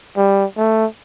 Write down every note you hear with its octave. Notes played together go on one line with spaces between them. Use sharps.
G3
A3